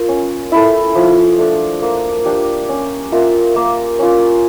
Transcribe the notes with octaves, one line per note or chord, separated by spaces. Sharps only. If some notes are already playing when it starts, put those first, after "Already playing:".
Already playing: F4 A#4
C#4
E4 A4
F3
A3 D4
A#3
D4 G4
C#4
F4 A#4 E5
A#3
C#4 F4